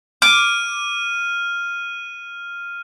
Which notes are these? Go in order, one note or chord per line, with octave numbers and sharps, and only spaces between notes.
D6 F6 D#7